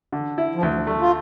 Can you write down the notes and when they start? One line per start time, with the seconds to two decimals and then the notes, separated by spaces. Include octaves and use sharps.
0.12 D3
0.38 E4
0.55 F3
0.62 D2 E3
0.74 F3
0.87 G3 A3
1.01 F4